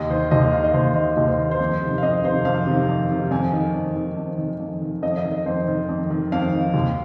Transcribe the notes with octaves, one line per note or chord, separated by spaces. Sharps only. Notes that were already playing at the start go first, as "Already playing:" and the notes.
Already playing: D#2 D#5
D#3 C5
D#2 D#5
F5
D#3 F5
D#5
D#2 C5
D#3 D#5
D#2 D#5
C5
D#3
C5
F2
C3 D#3
F5
F2 D#5
C3 D#3 C5
F2 F5
C3 D#3
F2
C3 D#3
F2 G#5
D#3
F2
D#3
F2
D#3
F2
D#3
F2 D#5
D#5
D#3
D#5
F2 C5
D#3
F2
D#3
F2 F5
D#3
D#2